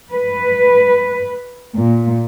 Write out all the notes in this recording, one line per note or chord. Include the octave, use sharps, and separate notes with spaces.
B4
A#2